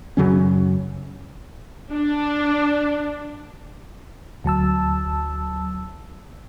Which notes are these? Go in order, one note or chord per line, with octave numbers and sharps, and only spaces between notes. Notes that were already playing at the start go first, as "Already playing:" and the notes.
F#2 C#3 F#3 C#4
D4
D2 F#3 A5 E6